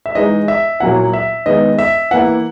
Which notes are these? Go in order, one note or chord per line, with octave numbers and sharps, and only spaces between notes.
E5
E3 G#3 D#4 D#5
E5
A#2 F#3 A#3 E4 F#5
E5
D#3 G#3 B3 D#4 D#5
E5
E3 A#3 E4 F#5